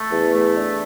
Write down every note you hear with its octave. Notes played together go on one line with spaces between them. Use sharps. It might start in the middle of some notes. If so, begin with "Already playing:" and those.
Already playing: A3
E2
A3
D4